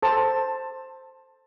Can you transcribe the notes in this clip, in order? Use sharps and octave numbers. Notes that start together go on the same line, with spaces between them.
A4 C5 A5